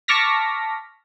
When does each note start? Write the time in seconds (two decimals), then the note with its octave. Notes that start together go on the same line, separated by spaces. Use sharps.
0.08 A5 C#6 D6 F6 A#6 B6